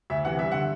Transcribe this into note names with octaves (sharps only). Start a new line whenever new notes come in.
D2 E5
C3 E3 F#5
G2 E5
D3 F#5